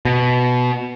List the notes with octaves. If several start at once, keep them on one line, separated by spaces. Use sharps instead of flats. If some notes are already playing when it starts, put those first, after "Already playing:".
B2